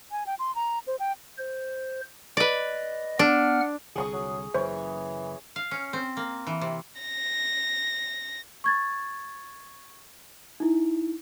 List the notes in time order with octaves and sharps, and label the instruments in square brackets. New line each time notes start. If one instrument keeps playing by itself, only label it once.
[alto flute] G#5
G5
C6
A#5
C5
G5
[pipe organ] C5
[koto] B4 D5 [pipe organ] D#5
[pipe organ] B3 F#5 F6 [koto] D4
[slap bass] C2 D3 [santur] G#4 C#6 D#6
[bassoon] F#3
[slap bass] F#1 F#2 [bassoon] E3 [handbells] C5 [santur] C#5
[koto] F5
C#4
C4
A#3
E3
C3
[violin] A#6
[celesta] C#6 G#6 A6
D#4 E4